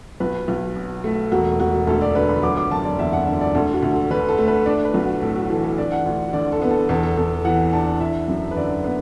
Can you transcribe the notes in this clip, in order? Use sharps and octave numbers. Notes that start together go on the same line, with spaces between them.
B1 B4
B1
B2
A3
E1 F#4
E1 F#4
D2 A4
D5
D3 B4
B5
F#3 D6
D6
F#1 A5
D5
E2 E5
F#5
D3 E5
D5
D2 A4
F#4
D2
A4
D3 B4
A4
A3
B4
D4 D5
B4
B1
F#4
A2 A4
F#4
E3 A4
A4
D4 D5
F#5
D2
D3 D5
A4
B3
A4
E2 A4
A4
E2 A4
E3 F#5
D4 A5
E4 E5
F#2
B4
D3 D5
B3